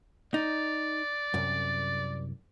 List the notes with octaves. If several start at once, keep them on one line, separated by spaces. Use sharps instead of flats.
D#4 D5
C2 F#2